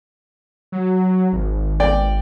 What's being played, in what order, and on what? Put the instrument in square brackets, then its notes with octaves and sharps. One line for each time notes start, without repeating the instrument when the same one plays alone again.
[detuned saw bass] F#3
G#1
[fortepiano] D5 G5